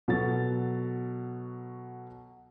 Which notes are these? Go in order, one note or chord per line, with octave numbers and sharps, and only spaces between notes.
B2 F#3 A4 A6